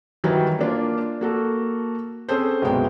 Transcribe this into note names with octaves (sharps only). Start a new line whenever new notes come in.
D#3 E3 F#3 G3
A#3 D4 F4
A#3 F#4 A4
C4 C#4 G#4 A4 C5
G1 C2 B2 F#3 G#3 G5